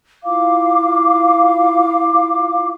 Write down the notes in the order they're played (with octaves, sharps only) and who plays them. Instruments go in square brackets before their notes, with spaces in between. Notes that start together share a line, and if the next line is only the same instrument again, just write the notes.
[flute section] E4 F4 F5 D6